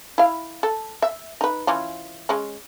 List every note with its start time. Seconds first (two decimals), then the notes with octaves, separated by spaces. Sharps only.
0.18 E4 F5
0.63 A4
1.02 E5
1.41 D#4 B4
1.67 E3 C#4 F4
2.29 G#3 C#4